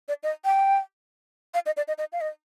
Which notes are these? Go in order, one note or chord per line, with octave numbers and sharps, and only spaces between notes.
D5
D#5
G5
F5
D#5
D5
D#5
D#5
F5
D#5